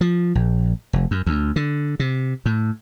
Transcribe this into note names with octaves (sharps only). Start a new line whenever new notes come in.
F3
A#1
F1
F#2
D2
D3
C3
A2